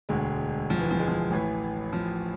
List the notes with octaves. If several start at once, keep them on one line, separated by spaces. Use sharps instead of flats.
E1 D2 D3 G#3
F3
E3
F3
G#3
F3
A1 A2 E3
F3